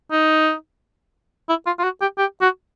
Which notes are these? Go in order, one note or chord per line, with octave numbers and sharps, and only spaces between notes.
D#4
E4
F4
F4
F#4
G4
G4
F#4